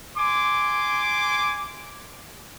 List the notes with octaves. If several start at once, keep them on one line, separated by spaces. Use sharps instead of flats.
G#5 C6 D6